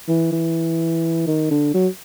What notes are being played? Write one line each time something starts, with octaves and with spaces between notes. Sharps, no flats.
E3
E3
D#3
D3
F#3